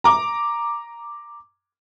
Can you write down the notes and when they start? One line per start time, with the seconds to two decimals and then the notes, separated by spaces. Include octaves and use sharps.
0.04 A#5 D6